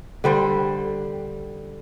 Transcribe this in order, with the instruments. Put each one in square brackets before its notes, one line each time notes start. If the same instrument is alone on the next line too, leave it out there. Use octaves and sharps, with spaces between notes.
[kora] D3 G3 C5